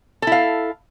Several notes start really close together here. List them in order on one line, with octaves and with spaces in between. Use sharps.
A4 E4 F5